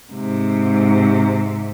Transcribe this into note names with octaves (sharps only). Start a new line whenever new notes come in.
G#2 C3